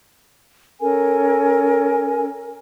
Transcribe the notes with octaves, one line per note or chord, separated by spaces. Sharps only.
C#4 A4 A#4 G#5